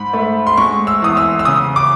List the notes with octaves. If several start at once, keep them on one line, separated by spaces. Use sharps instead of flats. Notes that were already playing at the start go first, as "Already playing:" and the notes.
Already playing: G#2 B5
A3
C6
G#3 C#6
E6
E2 D#6
E6
E6
C#3 D#6
D6